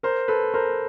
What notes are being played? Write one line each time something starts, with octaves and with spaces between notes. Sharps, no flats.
A#4 C5
A4 B4
A#4 C5